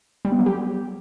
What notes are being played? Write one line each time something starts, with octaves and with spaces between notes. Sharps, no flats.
G3
B3
F#3
G4